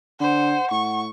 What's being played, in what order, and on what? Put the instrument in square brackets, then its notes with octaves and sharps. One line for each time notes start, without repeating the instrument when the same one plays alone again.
[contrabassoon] D3 [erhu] C5 [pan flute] F#5
[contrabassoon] A2 [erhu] C#6